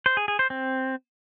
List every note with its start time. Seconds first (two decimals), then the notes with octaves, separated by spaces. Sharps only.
0.06 C5
0.17 G#4
0.28 G#4
0.39 C5
0.50 C4